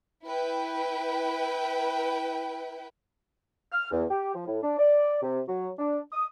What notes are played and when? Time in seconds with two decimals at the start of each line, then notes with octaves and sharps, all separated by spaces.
0.23 E4 B4 G5
3.72 F6
3.92 E2
4.11 G4
4.35 F3
4.47 A2
4.63 D4
4.79 D5
5.23 C3
5.48 F#3
5.79 D4
6.12 D#6